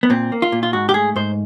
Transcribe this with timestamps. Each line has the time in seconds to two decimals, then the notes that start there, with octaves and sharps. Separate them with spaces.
0.03 B3
0.10 A#2 C4
0.32 A#3
0.42 F4
0.52 A#2
0.63 F4
0.73 G#2 F#4
0.89 G4
0.94 A3 G#4
1.16 G#2 C5